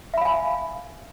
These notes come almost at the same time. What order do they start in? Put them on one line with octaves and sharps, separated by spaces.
E5 B5 F5 G#5